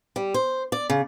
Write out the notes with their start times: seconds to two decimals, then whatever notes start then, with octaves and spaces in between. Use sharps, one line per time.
0.16 G3
0.34 C5
0.72 D5
0.90 C#3